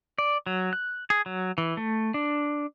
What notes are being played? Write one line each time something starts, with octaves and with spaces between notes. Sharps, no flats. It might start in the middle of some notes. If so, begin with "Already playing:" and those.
D5
F#3
F#6
G#4
F#3
E3
A3
D4